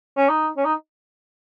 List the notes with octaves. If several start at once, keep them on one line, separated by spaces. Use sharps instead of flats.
C#4
D#4
C#4
D#4